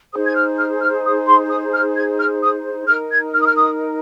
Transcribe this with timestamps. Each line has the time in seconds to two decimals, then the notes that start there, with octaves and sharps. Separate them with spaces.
0.12 D#4 G#4 C5 D#6
0.25 G#6
0.36 F6
0.58 F6
0.80 F6
1.05 D#6
1.27 C6
1.50 D#6
1.72 F6
1.95 G#6
2.18 F6
2.42 D#6
2.88 D#4 A#4 F6
3.11 G#6
3.34 F6
3.41 D#6
3.47 F6
3.56 D#6